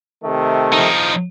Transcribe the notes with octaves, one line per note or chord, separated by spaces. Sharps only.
C3 D#3 A3
F3 D#4